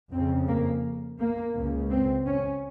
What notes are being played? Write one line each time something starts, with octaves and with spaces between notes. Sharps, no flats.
F2 C#3 C4
A#3
A#3
C#2 C#3
C4
C#4